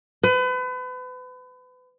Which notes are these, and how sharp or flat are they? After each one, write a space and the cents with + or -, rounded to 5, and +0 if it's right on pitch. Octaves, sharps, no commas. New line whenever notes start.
B4 +35